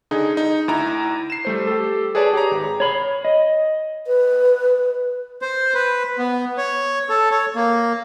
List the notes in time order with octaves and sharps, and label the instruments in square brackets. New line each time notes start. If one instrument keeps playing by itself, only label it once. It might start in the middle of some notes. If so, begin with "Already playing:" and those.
[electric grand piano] D3 D#4 G#4
D#4
D2 E4 A#5
C7 E7
G3 A3 C5
G4 A4
G#4 B4 C#5 D5 A5
G4 G#4 C#5 A#5
G#1
[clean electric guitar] C#5 B5
D#5
[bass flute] B4
[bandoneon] C5
B4
B3
C#5
A4
C#5
A#3